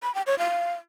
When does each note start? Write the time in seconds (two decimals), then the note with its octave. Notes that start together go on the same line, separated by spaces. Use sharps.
0.03 B5
0.15 G5
0.27 C#5
0.38 F5